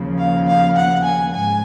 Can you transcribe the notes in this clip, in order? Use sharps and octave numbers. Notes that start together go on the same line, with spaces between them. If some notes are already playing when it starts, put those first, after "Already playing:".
Already playing: D#2 C#3 F3
F5
F5
F#5
G#5
G#2 G#5